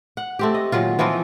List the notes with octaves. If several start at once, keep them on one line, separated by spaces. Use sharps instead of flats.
F#5
A3 C4 G4
D#5
A#2 D#3 F#3 F4
E3 F3 C4 F4